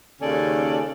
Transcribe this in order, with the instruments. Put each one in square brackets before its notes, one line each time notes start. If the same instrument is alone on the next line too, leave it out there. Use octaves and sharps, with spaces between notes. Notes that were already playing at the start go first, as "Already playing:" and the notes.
[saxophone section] D#2 C#3 C#4 A4 D5